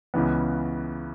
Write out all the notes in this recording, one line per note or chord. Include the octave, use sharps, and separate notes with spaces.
C#2 C#3 E3 B3